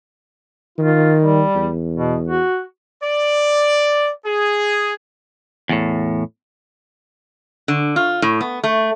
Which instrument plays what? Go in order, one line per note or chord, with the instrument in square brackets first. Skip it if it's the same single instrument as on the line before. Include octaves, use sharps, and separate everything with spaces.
[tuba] D#3 [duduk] F4
[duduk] G3
[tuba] E2
[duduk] B2
F#4
[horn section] D5
G#4
[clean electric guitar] E2 A2
[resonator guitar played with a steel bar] D3
F4
A2
B3
A3